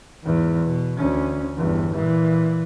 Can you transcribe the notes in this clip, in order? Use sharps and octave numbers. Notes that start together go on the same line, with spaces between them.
E2 G#2
B2
D2 C#4
G1 E2
A#2 E3